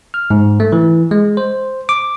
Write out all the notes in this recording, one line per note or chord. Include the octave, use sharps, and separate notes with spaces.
F6
G#2
A3
E3
G#3
C5
D6